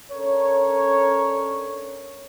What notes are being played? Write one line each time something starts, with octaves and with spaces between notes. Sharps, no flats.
C#4 D4 A4 A#4 C#5